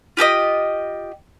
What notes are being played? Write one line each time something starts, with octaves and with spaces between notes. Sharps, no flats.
F4 G4 A4 D#5